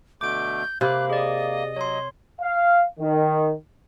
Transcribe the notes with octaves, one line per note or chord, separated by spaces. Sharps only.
B2 D3 A3 D6 G6 D7
C3 A#3 F5 B5 D6 F#6
G#4 D5 D#5
F#3 C#5 C6
F5
D#3